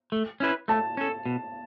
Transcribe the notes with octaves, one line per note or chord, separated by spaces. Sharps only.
A3
C#4 E4 B4
A3 A5
C#4 A4
B2